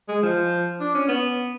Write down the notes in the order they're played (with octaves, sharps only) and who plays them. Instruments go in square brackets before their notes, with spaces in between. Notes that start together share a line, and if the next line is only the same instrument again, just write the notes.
[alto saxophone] G#3
F3
D4
C#4
B3